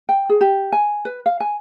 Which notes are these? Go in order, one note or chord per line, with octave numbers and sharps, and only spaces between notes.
G5
G#4
G4
G#5
B4
F5
G#5